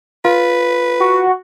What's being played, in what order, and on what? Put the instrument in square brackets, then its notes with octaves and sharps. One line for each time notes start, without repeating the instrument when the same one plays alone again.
[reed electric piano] F4 [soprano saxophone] B4
[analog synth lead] F#4